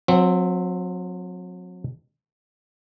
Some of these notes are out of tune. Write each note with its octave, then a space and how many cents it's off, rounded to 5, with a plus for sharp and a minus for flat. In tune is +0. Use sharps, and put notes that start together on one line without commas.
F#3 -35 C4 +0